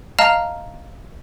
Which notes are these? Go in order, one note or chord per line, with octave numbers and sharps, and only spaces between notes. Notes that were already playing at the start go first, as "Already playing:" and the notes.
D#5 F5 A5 A#5 F6